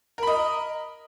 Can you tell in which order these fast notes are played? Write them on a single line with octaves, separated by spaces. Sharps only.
A#4 B5 D#5